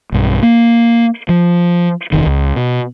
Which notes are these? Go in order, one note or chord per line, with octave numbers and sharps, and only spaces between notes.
B1 G2
A#3
F3
E1 A#1 D#3
C#2
B2